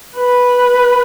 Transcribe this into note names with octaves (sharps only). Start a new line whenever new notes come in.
B4